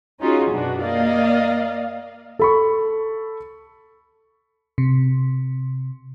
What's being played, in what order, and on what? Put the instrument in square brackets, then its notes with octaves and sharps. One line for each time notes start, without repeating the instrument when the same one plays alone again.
[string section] C#4 D#4 F4 F#4 G#4
F#2 B2 D4 F#4
A#3 D5 D#5 F5
[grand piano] A4 B5 C#6
[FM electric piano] C3